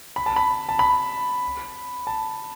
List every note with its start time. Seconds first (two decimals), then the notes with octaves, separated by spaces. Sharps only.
0.16 B5
0.26 A5
0.36 B5
0.69 A5
0.79 B5
2.07 A5